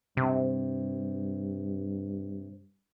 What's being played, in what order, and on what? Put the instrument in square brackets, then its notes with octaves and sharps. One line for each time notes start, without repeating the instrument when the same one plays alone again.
[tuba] G2 [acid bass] C3